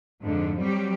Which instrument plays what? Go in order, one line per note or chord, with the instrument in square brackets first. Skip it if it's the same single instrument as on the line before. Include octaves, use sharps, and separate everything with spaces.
[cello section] F2 G#2 D3 F3
F#3 G3 C4 G4